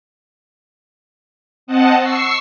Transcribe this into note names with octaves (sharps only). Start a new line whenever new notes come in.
C4 D#5 F#5 A5
C#6 E6 C7